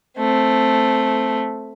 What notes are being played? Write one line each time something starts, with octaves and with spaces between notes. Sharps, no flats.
A3 C4